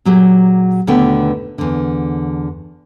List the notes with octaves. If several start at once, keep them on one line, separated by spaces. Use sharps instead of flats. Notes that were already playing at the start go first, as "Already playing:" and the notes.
A#2 F#3 G4 G#4
D#2 B2 D3 A3 B3 G5
E2 D3